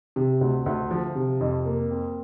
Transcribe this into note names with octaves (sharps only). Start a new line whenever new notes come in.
C3
D2
D2
F3
C3
F2
A#3
C4